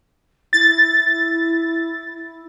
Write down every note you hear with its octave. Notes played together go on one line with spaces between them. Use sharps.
E4 A6